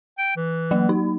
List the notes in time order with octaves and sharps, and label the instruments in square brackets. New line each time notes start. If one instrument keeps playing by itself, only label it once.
[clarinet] G5
E3
[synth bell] F#3 A#3
D#4